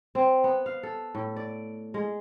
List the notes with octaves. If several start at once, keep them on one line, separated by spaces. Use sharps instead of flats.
C4
B3
F5
A4
A2
D5
G#3